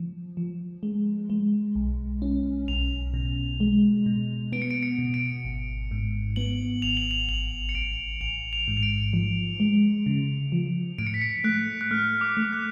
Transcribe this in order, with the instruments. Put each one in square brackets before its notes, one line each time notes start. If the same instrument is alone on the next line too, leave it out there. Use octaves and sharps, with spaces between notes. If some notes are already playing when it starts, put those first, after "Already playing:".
Already playing: [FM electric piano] F3
F3
G#3
G#3
B1
C#4
[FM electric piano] B1 [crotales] F7
[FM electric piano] B2
G#3
B2
[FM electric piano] B3 [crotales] D7
[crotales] C#7
D7
C#7
[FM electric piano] B2
[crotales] D7
[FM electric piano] G#1
G#2
[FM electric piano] B3 [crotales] F#7
[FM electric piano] G#1 [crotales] F7
[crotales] F#7
F7
[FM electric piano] A1 [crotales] F#7
[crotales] C#7
[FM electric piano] A1 [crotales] D7
[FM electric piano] A1 [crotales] F7
[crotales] F7
[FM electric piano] G#2
[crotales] F7
D7
[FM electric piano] F3
G#3
C#3
F3
[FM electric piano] A2 [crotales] D7
[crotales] C#7
B6
C#7
[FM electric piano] A3 [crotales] F#6
[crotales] F#6
[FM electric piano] A3 [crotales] F6
[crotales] D6
[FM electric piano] A3
[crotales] F#6